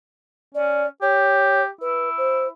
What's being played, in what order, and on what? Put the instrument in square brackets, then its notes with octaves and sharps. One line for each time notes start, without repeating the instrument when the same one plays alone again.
[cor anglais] C#4 [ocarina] D5
[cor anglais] G4 [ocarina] C#5
[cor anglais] E4 [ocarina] B4
[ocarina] C5